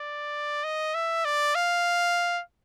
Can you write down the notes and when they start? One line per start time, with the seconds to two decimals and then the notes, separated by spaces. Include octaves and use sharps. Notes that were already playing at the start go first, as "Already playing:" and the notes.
Already playing: D5
0.64 D#5
0.95 E5
1.25 D5
1.55 F5